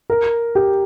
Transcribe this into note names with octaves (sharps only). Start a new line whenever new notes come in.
A#4
G4